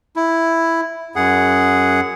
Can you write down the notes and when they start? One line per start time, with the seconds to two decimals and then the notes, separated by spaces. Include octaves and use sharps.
0.16 E4
1.16 F#2 G#4 F#5